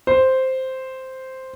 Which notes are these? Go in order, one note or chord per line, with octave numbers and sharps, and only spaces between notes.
C5